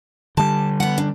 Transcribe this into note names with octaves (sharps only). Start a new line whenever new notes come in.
D3 G3 A5
B3 F#5
D4